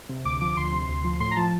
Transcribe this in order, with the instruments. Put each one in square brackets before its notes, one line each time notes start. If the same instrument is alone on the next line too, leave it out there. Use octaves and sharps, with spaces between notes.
[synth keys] C3
D2 D6
F3 D6
D2 C6
C3
D2
F3
A2 C6
A#5
F3 A5